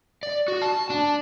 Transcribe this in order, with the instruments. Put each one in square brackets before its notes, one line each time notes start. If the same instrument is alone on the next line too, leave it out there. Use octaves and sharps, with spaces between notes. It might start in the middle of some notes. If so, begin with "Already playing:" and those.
[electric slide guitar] D5
F#4
A5
D4